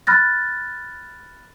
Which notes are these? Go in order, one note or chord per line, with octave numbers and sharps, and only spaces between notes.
B5 F6 F#6 A6 A#6